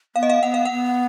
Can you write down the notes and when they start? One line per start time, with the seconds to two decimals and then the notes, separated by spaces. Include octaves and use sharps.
0.16 B3 F5
0.23 D#5
0.30 F5
0.43 B3 F#5
0.54 F5
0.65 B3 F#5